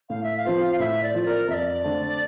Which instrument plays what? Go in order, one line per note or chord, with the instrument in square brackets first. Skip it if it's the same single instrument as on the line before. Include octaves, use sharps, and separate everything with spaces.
[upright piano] A2 [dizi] F5
[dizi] E5
F5
[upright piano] F3 C4 F4
[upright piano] A2 [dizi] E5
[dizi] D5
[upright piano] F3 C4 F4
[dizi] A#4
[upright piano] F2 [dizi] E5
[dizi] D5
[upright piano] D3 A3 C4